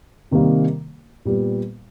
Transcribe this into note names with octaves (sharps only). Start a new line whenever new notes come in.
C3 D#3 G3 A#3
A#2 G3 B3